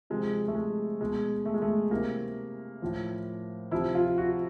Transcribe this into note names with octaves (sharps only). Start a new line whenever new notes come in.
C3 F3 G#3
A3
G#3
B2 G#3
A3
G#3
A3
C3 E3 A#3
A2 F3
C3 F3 E4
F4
F#4